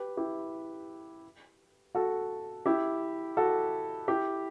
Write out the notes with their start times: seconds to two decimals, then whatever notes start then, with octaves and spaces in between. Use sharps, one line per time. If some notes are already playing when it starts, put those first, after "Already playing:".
Already playing: G4 B4
0.17 E4 G4
1.95 F#4 A4
2.66 E4 G4
3.37 F#4 A4
4.08 E4 G4